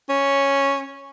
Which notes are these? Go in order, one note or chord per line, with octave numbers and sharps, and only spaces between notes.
C#4